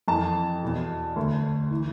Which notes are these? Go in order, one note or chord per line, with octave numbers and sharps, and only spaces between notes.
F2 E3 A5
E2 B2
D2 D3
E3